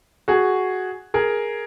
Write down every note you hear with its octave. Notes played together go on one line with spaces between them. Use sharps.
F#4 G#4
G#4 A#4